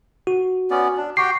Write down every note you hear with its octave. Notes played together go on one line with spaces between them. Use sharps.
F#4
B3 C#4 D5
D4
F#4 G4 G5 C7